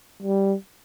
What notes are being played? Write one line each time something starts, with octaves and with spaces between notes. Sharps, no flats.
G3